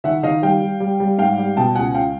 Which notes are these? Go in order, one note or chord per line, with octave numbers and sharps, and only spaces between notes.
D#3 E5 F#5
D#3 D#5 F5
G3 F5 G5
G3
G3
G3
G#2 F5 G5
G3
B2 G5 A5
C#2 F#5 G#5
C#2 F5 G5